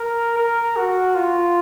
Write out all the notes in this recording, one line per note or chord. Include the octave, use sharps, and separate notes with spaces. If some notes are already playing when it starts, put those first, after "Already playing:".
Already playing: A#4
A#4
F#4
F4